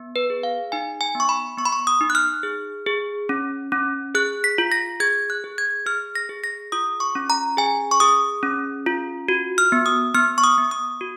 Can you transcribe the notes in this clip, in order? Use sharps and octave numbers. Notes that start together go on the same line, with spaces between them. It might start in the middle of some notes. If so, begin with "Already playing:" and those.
Already playing: B3
B4
G#4
F5
D#4 G#5
G#5
B3
C#6
B5
B3 C#6
B5
C#6
D#6
D#4
F#6
F6
G#4
G#4
C#4
C#4
G#4 F#6
B6
F4
A#6
G#4 G#6
F#6
G#4
G#6
G#4 F6
A#6
G#4
A#6
F4 D#6
C#6
C#4
A#5
G#4 G#5
C#6
G#4 D#6
C#4
F4
F#4
F6
B3
D#6
B3 F6
C#6
D#6
B3
D#6
F#4